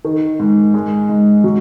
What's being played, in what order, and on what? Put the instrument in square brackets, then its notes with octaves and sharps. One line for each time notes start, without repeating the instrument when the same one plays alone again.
[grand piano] D#3
G#2
G#3
G#2
F#3